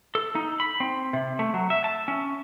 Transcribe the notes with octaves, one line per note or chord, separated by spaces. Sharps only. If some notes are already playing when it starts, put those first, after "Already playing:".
A4
D#4
B5
C4
C3
A3
F#3
E5
A5
C#4